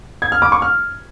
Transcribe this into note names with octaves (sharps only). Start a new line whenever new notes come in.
G#6
F6
D6
C#6
F6